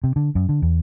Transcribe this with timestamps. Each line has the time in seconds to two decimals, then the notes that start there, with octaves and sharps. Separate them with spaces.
0.04 C3
0.16 D3
0.35 F#2
0.49 D3
0.62 E2